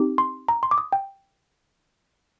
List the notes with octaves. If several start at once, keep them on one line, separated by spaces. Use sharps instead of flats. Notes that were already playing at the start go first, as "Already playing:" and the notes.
Already playing: C4 D#4 G4
C6
A#5
C6
D6
D#6
G5